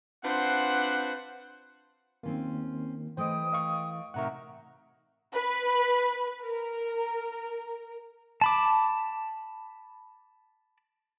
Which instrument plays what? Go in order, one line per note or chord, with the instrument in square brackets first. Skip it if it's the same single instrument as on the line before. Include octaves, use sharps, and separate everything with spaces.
[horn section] C4 D4 F4 B4 C5 F#5
[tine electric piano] D#3 A#3 [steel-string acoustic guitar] C4 C#4 F4
[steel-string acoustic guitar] E3 A3 [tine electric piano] C5 D#5 [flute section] G5 D#6
[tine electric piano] D#5 F5 C#6
[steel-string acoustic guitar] A2 C3 [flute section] D#4 A#4 E5 [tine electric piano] F#5 A#5 C#6
[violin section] B4
A#4
[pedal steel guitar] A5 B5 D6